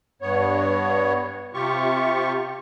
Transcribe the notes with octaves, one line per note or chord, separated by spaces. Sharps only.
G2 B3 C#5
C3 F4 G4 C#6